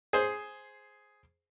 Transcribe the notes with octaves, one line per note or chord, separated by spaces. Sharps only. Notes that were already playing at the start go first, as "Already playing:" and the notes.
G#4 C5